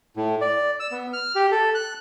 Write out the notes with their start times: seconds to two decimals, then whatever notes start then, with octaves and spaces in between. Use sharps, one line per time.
0.17 A2
0.41 D5
0.80 E6
0.91 B3
1.13 F6
1.35 G4
1.52 A4
1.75 F#6